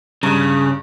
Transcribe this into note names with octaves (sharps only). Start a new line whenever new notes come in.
G2 C#3